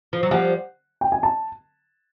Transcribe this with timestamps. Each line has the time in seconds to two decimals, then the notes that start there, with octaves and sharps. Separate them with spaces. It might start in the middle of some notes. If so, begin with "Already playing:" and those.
0.13 F3
0.23 F#3
0.31 F3 G3 F#5
1.01 G5
1.12 G#5
1.23 A5